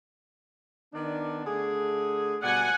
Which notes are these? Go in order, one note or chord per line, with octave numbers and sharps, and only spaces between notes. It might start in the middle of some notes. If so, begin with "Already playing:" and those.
D#3 B3 D4
D3 A3 G#4
B2 G3 D5 F#5 G#5